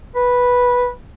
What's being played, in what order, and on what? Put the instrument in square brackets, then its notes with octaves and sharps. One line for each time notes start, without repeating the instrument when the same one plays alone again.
[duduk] B4